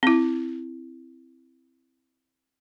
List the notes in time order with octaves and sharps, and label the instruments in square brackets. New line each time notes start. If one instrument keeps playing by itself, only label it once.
[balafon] C4 E4